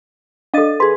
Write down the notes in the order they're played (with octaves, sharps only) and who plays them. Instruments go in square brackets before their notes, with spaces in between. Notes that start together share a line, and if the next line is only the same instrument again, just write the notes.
[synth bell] D4 D#5 A6 [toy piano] A4 F5
[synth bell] G#4 B4 [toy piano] C6